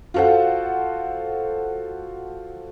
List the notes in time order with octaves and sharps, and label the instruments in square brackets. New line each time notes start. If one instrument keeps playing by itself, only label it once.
[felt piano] F4 F#4 A4 C5 F#5